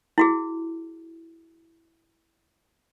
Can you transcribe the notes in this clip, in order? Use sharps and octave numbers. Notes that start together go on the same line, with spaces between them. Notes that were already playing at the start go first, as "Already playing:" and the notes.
E4 F#4 G#4